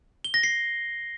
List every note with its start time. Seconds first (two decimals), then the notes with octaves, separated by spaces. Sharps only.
0.24 G7
0.34 A#6
0.43 C7